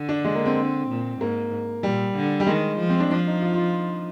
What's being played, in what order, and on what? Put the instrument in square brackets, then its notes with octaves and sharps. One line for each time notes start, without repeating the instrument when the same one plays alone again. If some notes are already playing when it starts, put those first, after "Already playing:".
Already playing: [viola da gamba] D3
[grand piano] D4
G#3
A#3
C4
[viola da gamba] A#2
[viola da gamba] G#2 [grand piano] A#3
[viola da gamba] A#2 [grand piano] G3
[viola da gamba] D3
[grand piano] G3
[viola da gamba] D#3 [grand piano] G#3
[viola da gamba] F3
[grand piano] C4
D4
[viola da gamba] F3 [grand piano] D4
[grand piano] D#4
F4
F4